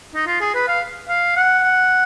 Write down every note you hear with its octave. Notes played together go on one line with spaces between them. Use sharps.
D#4
F4
G#4
B4
F5
F5
F#5
F#5